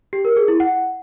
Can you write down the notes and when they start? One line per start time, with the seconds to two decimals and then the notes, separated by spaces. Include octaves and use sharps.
0.13 G4
0.25 A#4
0.36 G#4
0.48 E4
0.60 F#5